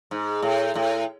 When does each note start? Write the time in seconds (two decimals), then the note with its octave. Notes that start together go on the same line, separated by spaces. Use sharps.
0.11 G#2
0.42 A2
0.75 A2